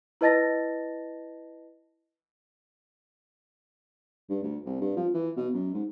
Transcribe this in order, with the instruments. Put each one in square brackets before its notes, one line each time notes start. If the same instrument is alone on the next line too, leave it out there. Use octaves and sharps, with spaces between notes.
[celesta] E4 B4 D#5 A5 A6 A#6
[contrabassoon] G2
D2
C2
G2
F3
E3
B2
F#2
G#2